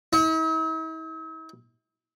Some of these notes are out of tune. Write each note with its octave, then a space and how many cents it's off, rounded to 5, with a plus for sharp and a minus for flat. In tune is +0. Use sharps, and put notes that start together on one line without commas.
E4 -45